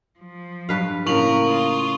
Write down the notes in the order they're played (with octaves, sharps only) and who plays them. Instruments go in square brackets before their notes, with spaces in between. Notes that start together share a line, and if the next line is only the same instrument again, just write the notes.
[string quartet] F3
[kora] G2 B4 F5
[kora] A2 C#3 [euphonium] A#3 [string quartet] A#4 [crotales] C#6 F7 F#7
[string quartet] F4 D#6